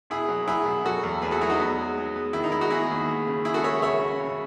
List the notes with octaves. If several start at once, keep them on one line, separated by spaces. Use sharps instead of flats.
B2 E4 G#4
F#3
F#3 E4 G#4
B2
F#3 F#4 A4
E2
E2 G#4 B4
F#4 A4
F#3 E4 G#4
D#4 F#4
B3
G#3
G#3
B3
D#3 E4
D#4
G#3 E4
D#4 F#4
B3 E4 G#4
D#2
G#3
C#3
G#3 E4 G#4
F#4 A4
G#3 C#5 E5
C#3 C#5 E5
C#4
C#3